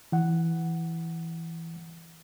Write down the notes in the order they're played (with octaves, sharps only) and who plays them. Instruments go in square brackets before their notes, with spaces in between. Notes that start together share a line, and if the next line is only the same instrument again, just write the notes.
[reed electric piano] E3 F#5